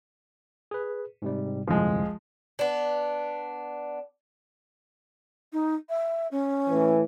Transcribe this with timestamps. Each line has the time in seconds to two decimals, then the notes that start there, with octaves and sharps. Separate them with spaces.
0.71 G#4 B4
1.22 G#2 C3 G3
1.67 G1 C2 F2 F3 G#3
2.59 B3 D4
5.53 D#4
5.89 E5
6.31 C#4
6.69 A2 E3